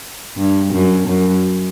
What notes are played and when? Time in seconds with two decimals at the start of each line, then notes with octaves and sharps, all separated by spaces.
0.36 G2
0.73 F#2
1.08 F#2